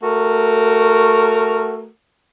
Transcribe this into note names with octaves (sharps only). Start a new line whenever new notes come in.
A3 F#4 A#4